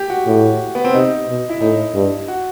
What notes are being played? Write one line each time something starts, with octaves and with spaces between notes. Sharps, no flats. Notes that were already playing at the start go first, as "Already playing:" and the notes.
Already playing: G4
F#4
A2
B3
C4
C3 D#4
B2
E4
A2 D#4
G2
F#4